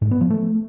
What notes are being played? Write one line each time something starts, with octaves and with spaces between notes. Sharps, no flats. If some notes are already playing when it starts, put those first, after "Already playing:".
G#2
B3
F3
A3